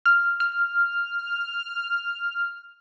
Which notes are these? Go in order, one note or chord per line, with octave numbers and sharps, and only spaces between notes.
F6
F6